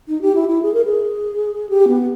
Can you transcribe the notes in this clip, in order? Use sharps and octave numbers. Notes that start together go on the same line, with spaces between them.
D#4
G4
E4
E4
G#4
A#4
G#4
G4
B3